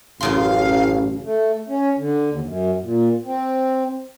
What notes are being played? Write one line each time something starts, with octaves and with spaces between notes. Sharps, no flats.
A1 F#2 C#3 F5 C6
A3
C#4
D3
D#2
F#2
A#2
C4